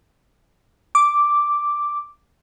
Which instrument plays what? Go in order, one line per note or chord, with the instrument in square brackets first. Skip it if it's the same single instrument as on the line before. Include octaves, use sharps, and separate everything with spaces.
[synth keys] D6